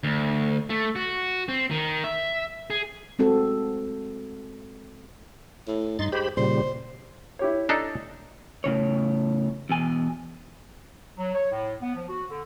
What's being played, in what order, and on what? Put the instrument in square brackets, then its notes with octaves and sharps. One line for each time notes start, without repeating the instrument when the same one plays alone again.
[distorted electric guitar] D2
A3
F#4
C4
D#3
E5
G#4
[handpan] G#3 C4 F#4 A4
[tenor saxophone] A2
[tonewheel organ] G2 C6 A6 [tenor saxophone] D#4
[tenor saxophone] G#3 [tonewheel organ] G4 C5 B5
[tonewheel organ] A#2 C#3 G3 [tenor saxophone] C5
[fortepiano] E4 G4 C#5
[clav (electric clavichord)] D4 D#4 A4
[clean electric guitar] A2 C#3 C#5
E2 B2 G#5
[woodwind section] F#3
C#5
A2
B3
F3
F#4
D3